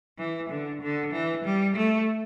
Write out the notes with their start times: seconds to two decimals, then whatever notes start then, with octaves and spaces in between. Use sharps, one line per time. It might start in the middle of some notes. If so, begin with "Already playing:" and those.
0.18 E3
0.50 D3
0.82 D3
1.12 E3
1.45 G3
1.76 A3